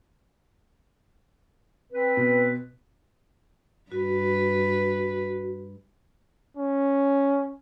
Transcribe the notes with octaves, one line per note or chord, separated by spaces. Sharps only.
C4 B4
B2
G2 F#4 B4
C#4